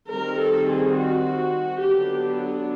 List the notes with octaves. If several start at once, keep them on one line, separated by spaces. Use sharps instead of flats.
D#3 G3 C4 A#4
A4
G#4
F#4
D3 F#3 B3 D4 G4